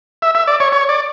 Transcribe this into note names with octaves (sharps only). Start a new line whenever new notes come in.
E5
E5
D5
C#5
C#5
D5